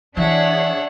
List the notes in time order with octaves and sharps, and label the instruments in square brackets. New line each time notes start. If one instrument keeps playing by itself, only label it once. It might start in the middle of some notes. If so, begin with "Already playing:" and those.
[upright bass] E3 E4 [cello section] D4 G#4 C#5 [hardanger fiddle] E5 F#5